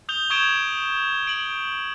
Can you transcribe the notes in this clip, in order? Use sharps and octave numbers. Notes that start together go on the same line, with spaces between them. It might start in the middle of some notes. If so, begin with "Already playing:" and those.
D#6 G6 F7 G7
C#6 D#6 G6 G#6 D7 E7
D7 F#7